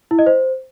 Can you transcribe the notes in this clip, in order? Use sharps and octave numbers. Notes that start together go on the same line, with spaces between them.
E4
D#5
C5